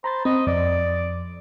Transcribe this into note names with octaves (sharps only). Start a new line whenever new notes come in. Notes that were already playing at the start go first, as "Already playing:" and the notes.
C5 A#5 B5 A6
C4 D#5
F2 D5